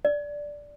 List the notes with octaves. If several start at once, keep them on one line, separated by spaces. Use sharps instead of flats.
D5